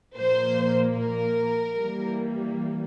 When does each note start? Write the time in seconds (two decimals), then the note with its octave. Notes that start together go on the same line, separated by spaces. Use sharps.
0.17 A#2 F3 A#3 C5
0.98 A#4
1.78 E3 G3 A#3